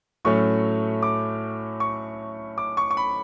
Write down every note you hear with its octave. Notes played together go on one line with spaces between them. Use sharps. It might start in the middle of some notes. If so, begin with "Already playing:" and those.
A2 F#3 A3 C#4 C#6
D6
C#6
D6
C#6
C#6
B5